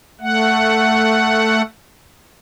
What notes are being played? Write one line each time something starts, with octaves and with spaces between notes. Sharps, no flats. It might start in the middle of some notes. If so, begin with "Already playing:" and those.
A3 F#5